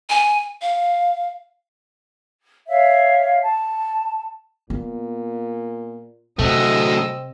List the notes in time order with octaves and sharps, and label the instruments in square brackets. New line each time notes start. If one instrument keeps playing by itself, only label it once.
[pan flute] G#5
F5
[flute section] C#5 E5 F5
A5
[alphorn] A#2 [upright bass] B3
[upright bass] C3 [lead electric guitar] F#3 A3 [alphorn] C4 [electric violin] D#5 E6